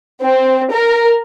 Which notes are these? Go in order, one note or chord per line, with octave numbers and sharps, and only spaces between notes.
C4
A#4